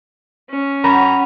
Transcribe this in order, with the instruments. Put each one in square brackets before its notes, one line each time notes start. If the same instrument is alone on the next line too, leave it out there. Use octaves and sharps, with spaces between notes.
[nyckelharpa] C#4
[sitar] F#2 [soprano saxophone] A#5 [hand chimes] B5